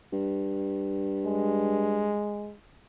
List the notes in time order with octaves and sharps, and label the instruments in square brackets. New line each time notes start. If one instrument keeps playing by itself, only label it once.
[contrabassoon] G2
[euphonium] G#3